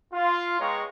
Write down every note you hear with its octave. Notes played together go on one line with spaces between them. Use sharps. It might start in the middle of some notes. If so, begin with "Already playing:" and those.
F4
G#3 B3 C#5 G5 A#5 C#6